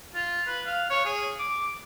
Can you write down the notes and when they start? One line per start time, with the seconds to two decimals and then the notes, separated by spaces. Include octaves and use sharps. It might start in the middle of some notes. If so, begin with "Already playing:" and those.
0.15 F4
0.47 B4
0.66 F5
0.90 C#5
1.05 G#4
1.39 D6